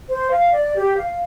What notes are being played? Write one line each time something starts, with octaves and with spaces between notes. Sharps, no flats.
C5
F5
D5
G4
F5